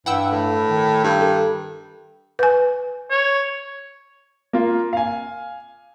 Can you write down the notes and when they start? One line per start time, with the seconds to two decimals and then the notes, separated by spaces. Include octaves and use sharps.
0.06 G2 E3 F#5 G5 E6
0.31 A2
0.69 D#3
1.04 G2
1.22 A4
2.39 B4 G#5
3.10 C#5
4.53 A#3 F4
4.93 F5 G#5